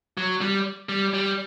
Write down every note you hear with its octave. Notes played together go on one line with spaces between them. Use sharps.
F#3
G3
G3
G3